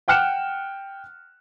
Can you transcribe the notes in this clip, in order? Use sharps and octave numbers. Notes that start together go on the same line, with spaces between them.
F#5 G5 F6 F#6 C#7 E7